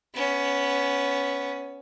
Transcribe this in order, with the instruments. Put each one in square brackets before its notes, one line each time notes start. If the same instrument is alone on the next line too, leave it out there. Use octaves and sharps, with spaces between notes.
[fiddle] B3 C#4